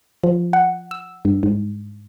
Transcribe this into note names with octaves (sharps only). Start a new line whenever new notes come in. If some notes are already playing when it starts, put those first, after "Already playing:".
F3
F#5
E6
G2
G#2